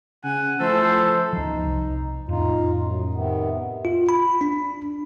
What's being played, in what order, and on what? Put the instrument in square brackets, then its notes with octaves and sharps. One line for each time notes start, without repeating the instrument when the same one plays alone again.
[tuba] C#3 [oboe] F#5 [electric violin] G#5
[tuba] F3 [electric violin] A3 E4 [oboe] A4 [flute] C5
[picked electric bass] C#2 F3 [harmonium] D#4
[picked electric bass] C2
[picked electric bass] F2 A2 [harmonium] D#4 F4
[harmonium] F#2
C3 D#3 B3
[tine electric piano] F4
B5
D4